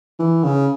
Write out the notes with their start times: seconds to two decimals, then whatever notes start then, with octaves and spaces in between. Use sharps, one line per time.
0.19 E3
0.44 C#3